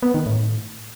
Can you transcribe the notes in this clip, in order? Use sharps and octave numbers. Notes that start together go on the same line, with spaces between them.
B3
D#3
A2